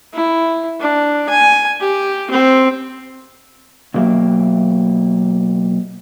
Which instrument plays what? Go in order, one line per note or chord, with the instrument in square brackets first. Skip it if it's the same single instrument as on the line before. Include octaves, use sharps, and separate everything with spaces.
[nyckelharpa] E4
D4
G#5
G4
C4
[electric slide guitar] B2 F#3 A#3 G4 E5